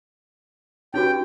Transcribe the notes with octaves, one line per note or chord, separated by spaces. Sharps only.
C#4 D#4 F#4 G4 B4 G5